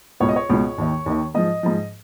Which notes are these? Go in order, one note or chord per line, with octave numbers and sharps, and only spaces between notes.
C#2 B2 C#5
D#5
C#5
C#2 B2
D#2 D#3
D#2 D#3
G#2 F3 D#5
G#2 F3